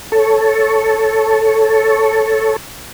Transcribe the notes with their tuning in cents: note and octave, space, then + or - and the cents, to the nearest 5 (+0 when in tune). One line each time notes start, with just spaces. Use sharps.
A4 +0 C#5 +0